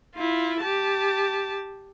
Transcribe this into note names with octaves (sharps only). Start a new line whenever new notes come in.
E4 F4
G4 A5